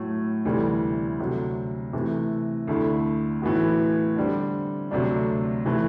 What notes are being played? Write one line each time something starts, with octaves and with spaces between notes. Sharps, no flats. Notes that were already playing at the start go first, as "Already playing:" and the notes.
Already playing: A2 F#3 A3
D2 C3 E3 G3
D2 C3 F#3
C3 E3 A3
D2 D3 A3 E4
A2 E3 B3 F#4
D3 G3 C4
D2 C3 F#3 A3 D4
C3 E3 A3 E4